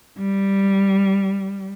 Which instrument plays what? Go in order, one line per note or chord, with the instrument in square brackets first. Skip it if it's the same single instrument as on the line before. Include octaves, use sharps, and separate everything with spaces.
[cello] G3